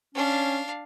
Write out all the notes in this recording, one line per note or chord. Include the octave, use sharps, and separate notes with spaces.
C#4 D4 F5